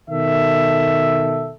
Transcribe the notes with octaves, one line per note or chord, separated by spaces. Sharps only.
B2 D#3 A4 E5